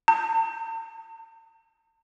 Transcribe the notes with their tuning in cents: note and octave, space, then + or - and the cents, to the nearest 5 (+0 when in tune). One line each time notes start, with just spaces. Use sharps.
A5 +45